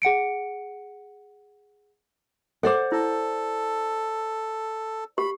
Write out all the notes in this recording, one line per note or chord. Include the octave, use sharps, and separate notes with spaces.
G#4 F#5 C#7 D7
A4 C5 D5 F#5 D6
E4 A4
G4 B5